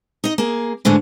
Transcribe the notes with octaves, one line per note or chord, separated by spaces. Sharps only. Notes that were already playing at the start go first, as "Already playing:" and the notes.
D#4 D#5
A#3 G#4
G#2 D3 E3 G#3 A3